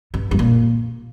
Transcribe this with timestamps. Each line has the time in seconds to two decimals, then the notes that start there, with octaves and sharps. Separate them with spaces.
0.14 G2
0.31 G2
0.39 A#2